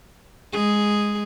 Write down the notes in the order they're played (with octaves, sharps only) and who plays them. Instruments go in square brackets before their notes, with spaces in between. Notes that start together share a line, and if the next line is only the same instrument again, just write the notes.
[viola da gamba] G#3 G#4